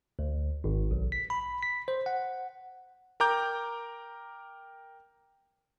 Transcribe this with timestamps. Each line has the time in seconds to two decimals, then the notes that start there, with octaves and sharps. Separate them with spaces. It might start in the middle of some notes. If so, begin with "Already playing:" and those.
0.19 D2
0.64 G#1
0.91 B1
1.12 B6
1.30 B5
1.63 B6
1.88 C5
2.06 F#5
3.20 A#4 G5 A#5 D6 G6